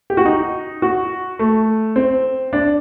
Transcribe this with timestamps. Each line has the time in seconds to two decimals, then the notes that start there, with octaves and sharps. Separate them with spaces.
0.10 G4
0.17 F#4
0.26 D#4
0.82 F#4
1.39 A3
1.96 C4
2.53 D4